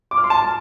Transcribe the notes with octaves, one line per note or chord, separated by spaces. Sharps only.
D6
F6
C6
A5